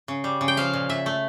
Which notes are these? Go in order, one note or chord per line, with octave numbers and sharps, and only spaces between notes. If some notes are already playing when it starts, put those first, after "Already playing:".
C#3
G3
C#3
G5
F3 F5
A#2
A#2 E5
A3